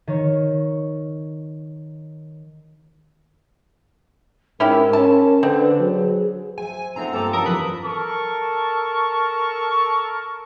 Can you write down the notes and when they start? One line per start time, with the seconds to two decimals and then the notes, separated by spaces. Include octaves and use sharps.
0.07 D#3 C#5
4.60 G#2 C#4 E4 G4 A#4
4.93 C#4 A#4 A5
5.43 D3 C4 B4
5.80 F#3 G#4
6.58 C5 E5 G#5
6.96 A3 B3 C4 D#4 F4 A#5
7.13 G2 A#3 C4 F4 G4 A4
7.33 C#4 E4 A#4 C#5 D#6
7.46 F2 D#3 E3 F#3 B4
7.83 A4 A#4 A5 C#6